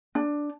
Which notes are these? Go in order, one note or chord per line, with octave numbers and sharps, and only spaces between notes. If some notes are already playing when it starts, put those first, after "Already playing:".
D4